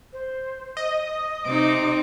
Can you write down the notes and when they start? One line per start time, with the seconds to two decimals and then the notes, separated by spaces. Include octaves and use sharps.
0.13 C5
0.77 D#5 D#6
1.46 C3 C4 D#4 D6